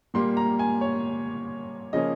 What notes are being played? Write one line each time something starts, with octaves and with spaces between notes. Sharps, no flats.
A#2 G3 A#3 C6
A#5
G#5
C#5
C#3 F3 A#3 C#4 D#5